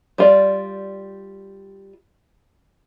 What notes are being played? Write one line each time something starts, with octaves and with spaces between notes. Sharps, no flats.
G3 F4 D5